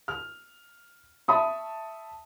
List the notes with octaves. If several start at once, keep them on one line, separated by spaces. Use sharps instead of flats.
F6
E5 A5 B5 C#6 D#6